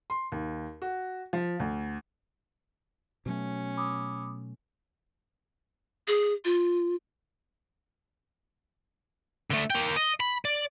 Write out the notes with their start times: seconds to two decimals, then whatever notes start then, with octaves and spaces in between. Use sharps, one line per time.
0.10 C6
0.32 D#2
0.82 F#4
1.33 F3
1.60 D2
3.26 B2 F#3 A3 C#4
3.77 B5 D6 D#6
6.08 G#4
6.45 F4
9.50 D3 A3
9.70 A#3 G5
9.96 D#5
10.20 B5
10.45 D5